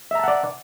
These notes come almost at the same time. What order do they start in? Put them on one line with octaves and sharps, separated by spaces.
E5 A#5 A5 F#5 D5